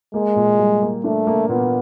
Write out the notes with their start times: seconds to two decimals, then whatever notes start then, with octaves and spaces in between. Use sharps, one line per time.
0.14 G#3 A#3
0.36 A#2
0.58 G3
0.82 A#3
1.04 A3 D4
1.27 A#3
1.49 A#2 B3